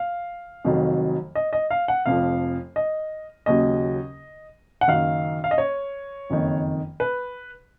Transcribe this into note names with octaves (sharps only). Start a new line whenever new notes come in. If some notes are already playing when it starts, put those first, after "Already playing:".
Already playing: F5
F1 F2 D#3 F#3
D#5
D#5
F5
F#5
F1 F2 F3 F5
D#5
D#2 C#3 F#3 D#5
F#5
F#1 F#2 D#3 F5
F5
D#5
C#5
F#1 F2 D#3
B4